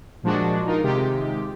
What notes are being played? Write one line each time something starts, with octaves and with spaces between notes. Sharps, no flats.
A#2 F3 G#3 D4 F#4
D#4 F4 A#4
C3 D#3 G#3 F4 G4